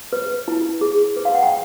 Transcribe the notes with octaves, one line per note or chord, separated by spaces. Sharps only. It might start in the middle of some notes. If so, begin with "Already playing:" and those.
B4
E4
G#4
B4
F5
F#5
G5